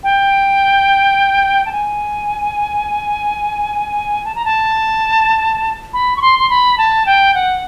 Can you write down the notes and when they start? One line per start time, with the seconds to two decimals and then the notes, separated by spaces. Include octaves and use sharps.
0.03 G5
1.66 A5
1.72 G#5
4.25 A5
4.35 A#5
4.45 A5
5.93 B5
6.17 C#6
6.22 C6
6.39 C6
6.50 B5
6.78 A5
7.06 G5
7.34 F#5